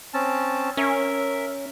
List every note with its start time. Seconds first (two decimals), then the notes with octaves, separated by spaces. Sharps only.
0.14 C4 C#4 A5
0.77 C#4 A#4 E5